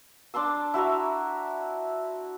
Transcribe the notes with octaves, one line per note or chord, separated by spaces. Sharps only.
D4 A5 C6 E6
E4 F#4 E5 A#5